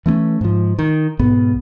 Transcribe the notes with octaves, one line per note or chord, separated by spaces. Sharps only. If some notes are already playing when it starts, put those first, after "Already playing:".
E3 A3 C4 C#4
G#2 F3
D#3
B1 G#2 B3